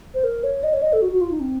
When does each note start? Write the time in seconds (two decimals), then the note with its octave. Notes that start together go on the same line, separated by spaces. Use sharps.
0.14 C5
0.24 A#4
0.44 C#5
0.64 D#5
0.73 C#5
0.82 D#5
0.93 A4
1.02 F#4
1.12 F#4
1.21 F4
1.31 D#4
1.40 C4